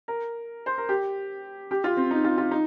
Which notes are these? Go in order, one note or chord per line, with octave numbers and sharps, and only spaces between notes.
A#4
C5
A#4
G4
G4
F4
C4
D#4
F4
F4
D#4